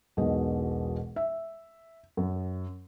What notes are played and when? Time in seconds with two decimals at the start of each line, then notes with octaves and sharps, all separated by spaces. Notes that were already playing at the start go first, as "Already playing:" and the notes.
0.17 E1 B1 B2 D#5
1.16 E5
2.17 F#2